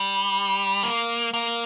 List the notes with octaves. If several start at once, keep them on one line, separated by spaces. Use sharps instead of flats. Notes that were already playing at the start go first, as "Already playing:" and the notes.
Already playing: G3
A#3
A#3